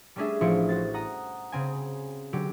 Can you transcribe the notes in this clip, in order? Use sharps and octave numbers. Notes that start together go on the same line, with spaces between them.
G3 A3 C#4 D4 G#4 E5
A1 F3 E4 C5 C#7
F#4 C5 A6
F#5 A#5 D#6
C#3 C4 G#5
D3 F#3 G4